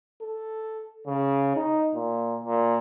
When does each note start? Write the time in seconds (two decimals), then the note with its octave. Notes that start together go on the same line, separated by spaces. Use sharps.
0.22 A4
1.07 C#3
1.56 D#4
1.95 A#2
2.44 A#2